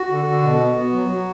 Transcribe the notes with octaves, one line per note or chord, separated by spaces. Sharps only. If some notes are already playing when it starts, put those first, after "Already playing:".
Already playing: F#4
D3
D3
B2
B3
B3
F#3
F#3